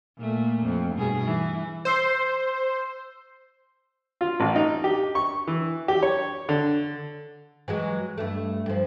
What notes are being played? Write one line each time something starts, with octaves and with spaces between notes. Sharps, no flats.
A#2 A3
F2
G2 B2 G#4
E3
C5 C6 E6 C7
F4
A1
D#4
G4
C#6
E3
G4
C#5
D3
E3 F#3 G#3
G2 A3
G2 F3